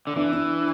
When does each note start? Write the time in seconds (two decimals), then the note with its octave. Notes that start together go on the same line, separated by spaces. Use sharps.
0.07 D3
0.16 E3 D4
0.33 D4